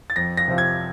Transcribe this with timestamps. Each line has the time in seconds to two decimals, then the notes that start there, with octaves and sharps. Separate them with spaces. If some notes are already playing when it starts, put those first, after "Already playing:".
0.10 A6
0.16 F2 A#6
0.37 A#6
0.48 C3 F3
0.58 G#6